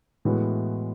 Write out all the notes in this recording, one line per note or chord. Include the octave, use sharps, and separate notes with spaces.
A2 E3 G#3 B3 F#4